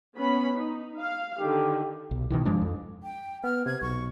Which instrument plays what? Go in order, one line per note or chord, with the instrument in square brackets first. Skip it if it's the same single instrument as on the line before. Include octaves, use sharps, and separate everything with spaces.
[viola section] B3 C#4 B5
D#4
F5
[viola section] D3 D#3 [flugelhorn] G4
[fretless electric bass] B1
B2 D#3 E3
G2 F3 G#3 D4
F2
[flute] G5
[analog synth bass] B3 [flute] F6
[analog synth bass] C3 [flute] G#6
[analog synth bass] B1 [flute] C#6